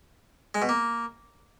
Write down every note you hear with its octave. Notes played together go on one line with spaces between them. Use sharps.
G#3
B2
A#3